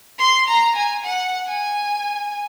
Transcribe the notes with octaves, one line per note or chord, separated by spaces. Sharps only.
C6
A#5
G#5
F#5
G#5